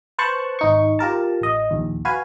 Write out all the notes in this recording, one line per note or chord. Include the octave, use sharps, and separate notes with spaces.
B4 C5 A5 C#6 F#6
G#1 D#4 C#6
F4 G4 A#4 A5
A1 D#5
A#1 D#2
F#4 B4 F5 G#5